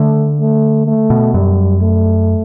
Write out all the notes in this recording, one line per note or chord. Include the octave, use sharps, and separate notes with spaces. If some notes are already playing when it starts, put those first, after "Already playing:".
Already playing: D3 A3
A3
A3
B2
F#2 G3
A3